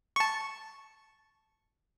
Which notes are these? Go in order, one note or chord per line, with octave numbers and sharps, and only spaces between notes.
A5 C#6